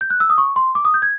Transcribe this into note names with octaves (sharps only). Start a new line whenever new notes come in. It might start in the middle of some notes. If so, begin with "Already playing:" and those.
G6
F#6
E6
D#6
C#6
C6
D6
D#6
G6
G#6